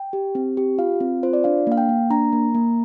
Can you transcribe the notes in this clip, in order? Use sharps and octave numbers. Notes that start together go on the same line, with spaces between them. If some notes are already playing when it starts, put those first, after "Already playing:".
Already playing: G5
G4
C4
G4
F4 F5
C4
F4 C5
D5
D4 F5
A#3 F5
G5
A#3
D4 A#5
A#3
A#3